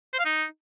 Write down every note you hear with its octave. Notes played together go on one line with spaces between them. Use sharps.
C5
F5
D#4